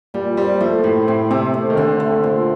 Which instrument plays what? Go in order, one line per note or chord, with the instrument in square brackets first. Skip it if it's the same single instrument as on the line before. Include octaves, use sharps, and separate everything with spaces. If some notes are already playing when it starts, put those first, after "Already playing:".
[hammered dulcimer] A#2 [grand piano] G3
[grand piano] G3 [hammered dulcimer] C4
[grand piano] F3 [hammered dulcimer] A3
[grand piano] A2 [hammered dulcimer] G4
[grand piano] A2 [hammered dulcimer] C4
[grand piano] C3 [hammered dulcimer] C4
[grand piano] C3 [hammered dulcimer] A3
[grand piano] D#3
[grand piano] D3 [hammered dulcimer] C4
[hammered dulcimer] A3
A#2